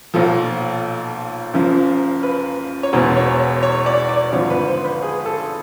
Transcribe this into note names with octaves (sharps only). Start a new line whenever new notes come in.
B1 A#2 F3 A4
F#1 F#2 C#3 F3
B4
C#5
E1 E2 B2 C5
C#5
C#5
C#5
D5
D5
G#1 G2 D3 F3 C#5
B4
C5
B4
G#4
A4